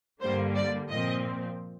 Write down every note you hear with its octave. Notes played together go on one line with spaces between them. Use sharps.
G2 D3 G3 A#3 C5
D5
A#2 F3 C4 D#5